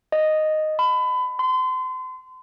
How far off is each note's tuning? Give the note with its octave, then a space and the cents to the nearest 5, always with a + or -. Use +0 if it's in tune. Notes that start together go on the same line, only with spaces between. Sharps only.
D#5 -5
B5 +30
C6 -35